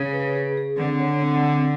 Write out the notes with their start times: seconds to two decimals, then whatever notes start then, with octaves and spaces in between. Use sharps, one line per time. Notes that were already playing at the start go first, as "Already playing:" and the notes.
Already playing: C#3 G#4
0.13 B4
0.35 G#4
0.57 G#4
0.79 D3 C4
1.00 C#5
1.22 C4
1.43 C4